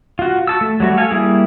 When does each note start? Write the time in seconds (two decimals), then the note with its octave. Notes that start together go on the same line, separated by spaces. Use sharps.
0.19 F4 F#4
0.47 F#4 A5 E6
0.61 A3
0.80 F#3 G3 A3 F#4
0.97 A4 F5 G#5
1.11 G3 A#3 E4 G#4